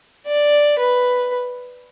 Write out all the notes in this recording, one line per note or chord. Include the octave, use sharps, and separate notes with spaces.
D5
B4